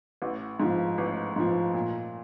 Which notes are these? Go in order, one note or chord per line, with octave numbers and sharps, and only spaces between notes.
A1
G#2 F3
A1
G#2 F3
A#2